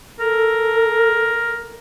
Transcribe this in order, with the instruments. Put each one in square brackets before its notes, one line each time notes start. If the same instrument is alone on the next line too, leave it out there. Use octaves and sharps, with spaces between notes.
[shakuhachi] A4 [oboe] A#4